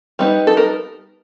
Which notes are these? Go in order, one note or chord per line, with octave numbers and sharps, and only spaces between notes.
G3 B3 D#4
A4
A#4